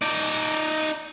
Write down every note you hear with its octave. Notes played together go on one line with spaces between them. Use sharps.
D#4 D5